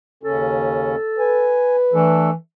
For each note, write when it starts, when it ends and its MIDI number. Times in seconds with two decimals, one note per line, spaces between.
0.23 0.96 39
0.23 0.96 49
0.23 0.96 61
0.23 1.65 69
1.19 2.24 71
1.19 1.76 80
1.94 2.33 52
1.94 2.30 57
1.94 2.30 62
1.94 2.30 69